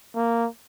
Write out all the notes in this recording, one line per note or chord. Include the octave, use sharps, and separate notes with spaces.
A#3